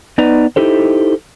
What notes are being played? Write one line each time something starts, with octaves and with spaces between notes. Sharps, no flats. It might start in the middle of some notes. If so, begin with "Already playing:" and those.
B3 D#4 B4 D5 A#5
D#4 E4 G4 A4 C5